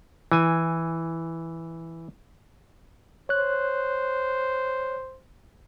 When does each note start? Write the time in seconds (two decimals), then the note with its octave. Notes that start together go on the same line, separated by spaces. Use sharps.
0.32 E3 G#5
3.29 C5 C#5 F#6